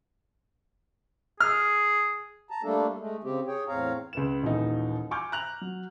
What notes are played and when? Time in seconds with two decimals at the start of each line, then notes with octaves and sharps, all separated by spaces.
1.40 G#4 F6
2.50 A5 A#5
2.63 G3 A3 A#3 D4 A4
2.99 G#3 A3
3.24 C#3 C4 G4
3.48 G#4 C#5 G5
3.68 E2 A2 C4 C#5 F5 A#5
4.13 C#2 B4 E7
4.43 D#1 D#2 E3 D#4
5.11 G#5 C#6 D6 F6 G6
5.32 A#5 F#6 F7
5.61 F#3